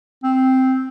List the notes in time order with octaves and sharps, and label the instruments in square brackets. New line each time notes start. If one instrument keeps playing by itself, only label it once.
[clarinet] C4